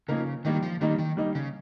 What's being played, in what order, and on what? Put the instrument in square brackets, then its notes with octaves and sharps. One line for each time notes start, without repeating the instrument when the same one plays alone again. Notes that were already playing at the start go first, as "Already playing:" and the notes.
[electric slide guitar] C#3 [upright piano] F3 A#3 D#4 A#4
[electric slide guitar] D#3 [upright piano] G3 A#3 D#4
[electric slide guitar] F3
[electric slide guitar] D#3 [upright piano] G3 A#3 D#4
[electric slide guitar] D#3
[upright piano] G3 A#3 D#4
[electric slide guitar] C#3